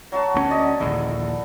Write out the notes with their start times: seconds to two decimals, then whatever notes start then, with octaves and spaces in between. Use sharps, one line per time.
0.12 F#3 F#4 A5
0.34 D2 A3 C#4
0.50 D5 D#5
0.80 A#1 D#2 D3 E4